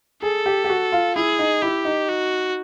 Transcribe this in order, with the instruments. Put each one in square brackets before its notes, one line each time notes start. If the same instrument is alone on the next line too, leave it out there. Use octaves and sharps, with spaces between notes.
[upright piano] G#4 [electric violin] A4
[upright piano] G4
G4
F#4
F4
[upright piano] E4 [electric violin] G#4
[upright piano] D#4
[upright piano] E4 [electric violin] G4
[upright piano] D#4
[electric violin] F#4